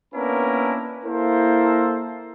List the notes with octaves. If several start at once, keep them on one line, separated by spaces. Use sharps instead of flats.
A#3 B3 C#4 D4 E4 A#4
A#3 E4 A4 A#4 C5